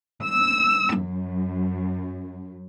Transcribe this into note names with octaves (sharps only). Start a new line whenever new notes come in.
E6
F#2